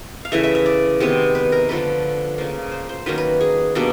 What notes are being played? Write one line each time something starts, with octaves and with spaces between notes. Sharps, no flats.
F5
C#3 E3 A3 E5
E5
E5
D5
C3 D#3 G#3 B3
B4
A#4
D3 F3 A3 D4 B4
C#3 F3 A#3
C5
C5
D#3 F#3 A#3 C#4 B4
B4
G#4
B2 G3 A#3 D4